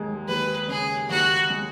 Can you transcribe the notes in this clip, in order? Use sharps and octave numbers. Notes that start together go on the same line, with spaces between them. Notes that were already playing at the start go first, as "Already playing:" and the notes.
Already playing: D#2 G#3
D#2 B4
C#3 G#4
D#2 F#4
G#3